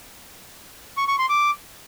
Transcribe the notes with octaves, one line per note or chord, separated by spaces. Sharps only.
C#6
C#6
C6
D6